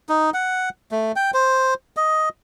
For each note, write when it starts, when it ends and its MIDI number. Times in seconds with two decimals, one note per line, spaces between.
0.09 0.30 63
0.34 0.69 78
0.92 1.12 57
1.16 1.31 79
1.34 1.74 72
1.97 2.29 75